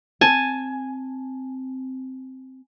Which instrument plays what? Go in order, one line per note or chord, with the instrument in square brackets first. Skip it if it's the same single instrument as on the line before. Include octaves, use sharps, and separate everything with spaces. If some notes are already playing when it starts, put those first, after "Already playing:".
[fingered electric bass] C4 [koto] G#5 [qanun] A5